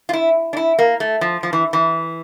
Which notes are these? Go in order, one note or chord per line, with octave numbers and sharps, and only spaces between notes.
F4
E4
D4
E4
A#3
A3
F3
F3
E3
E3